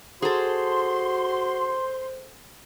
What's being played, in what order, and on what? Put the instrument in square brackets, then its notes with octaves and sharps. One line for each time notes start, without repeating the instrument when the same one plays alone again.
[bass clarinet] F#4 [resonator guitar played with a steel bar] G#4 A4 [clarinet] C5 [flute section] C6